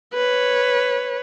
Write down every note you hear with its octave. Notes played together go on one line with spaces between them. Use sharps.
B4 C#5